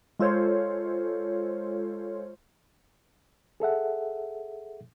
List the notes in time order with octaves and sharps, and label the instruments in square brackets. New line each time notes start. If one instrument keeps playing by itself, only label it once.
[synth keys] G#3 F4 A4 C5 C#5
[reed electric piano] G#4 A4 E5 F#5